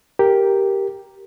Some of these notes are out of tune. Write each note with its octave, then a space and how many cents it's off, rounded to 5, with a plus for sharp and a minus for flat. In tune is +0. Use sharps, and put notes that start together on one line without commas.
G4 +0 A#4 +0